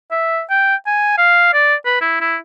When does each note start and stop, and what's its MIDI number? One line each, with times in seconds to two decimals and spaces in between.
0.11 0.41 76
0.50 0.75 79
0.87 1.15 80
1.18 1.52 77
1.54 1.74 74
1.86 1.99 71
2.01 2.16 64
2.21 2.37 64